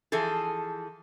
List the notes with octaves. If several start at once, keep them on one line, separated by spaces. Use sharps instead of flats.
E3 F3 G#4 A4